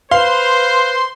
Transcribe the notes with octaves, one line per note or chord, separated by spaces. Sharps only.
B4 C5 F5 C6